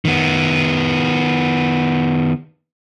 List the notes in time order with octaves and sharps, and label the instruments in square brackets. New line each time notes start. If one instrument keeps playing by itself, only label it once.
[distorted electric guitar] D#3 B3